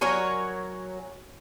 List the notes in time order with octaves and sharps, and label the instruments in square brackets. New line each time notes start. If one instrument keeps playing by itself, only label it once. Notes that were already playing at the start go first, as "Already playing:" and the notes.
[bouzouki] F#3 A#4 C#5 G#5